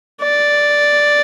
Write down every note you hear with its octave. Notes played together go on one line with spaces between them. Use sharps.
D5